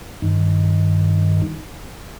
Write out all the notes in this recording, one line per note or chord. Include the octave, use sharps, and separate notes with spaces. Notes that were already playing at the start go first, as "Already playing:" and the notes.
G2 D#3